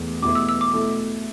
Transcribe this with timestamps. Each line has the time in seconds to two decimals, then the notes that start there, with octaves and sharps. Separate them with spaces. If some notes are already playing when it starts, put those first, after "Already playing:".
Already playing: E2 B2 A3 E4
0.22 E2 B2 A3 E4 B4 D6
0.35 E6
0.49 E6
0.61 D6
0.73 B2 A3 E4 A4